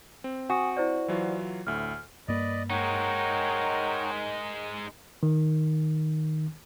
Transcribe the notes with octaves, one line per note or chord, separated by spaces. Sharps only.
C4
F#4 G#5 D#6
E4 C5 D5
E3 F#3 F4
D2 A2 F6
G2 A#3 B4 D5 D#5
G#3 D#4 A#4 C#5 F#5 G5
D#3